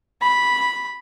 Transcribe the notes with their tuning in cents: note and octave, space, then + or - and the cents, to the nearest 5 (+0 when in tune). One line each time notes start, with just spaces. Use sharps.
B5 -10